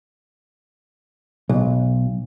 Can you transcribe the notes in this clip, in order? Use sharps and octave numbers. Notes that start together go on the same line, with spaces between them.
B1